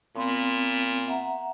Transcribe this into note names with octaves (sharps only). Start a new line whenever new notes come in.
A#2 B3 C4
E5 F#5 A#5